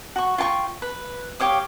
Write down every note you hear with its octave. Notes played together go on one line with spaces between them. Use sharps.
F#4 C#6
F4 G5 A5 C#6
B4
G4 C#5 F5 D#6